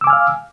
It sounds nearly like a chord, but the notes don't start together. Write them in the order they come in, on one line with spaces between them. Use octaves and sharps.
E6 D6 G#5 F6 F5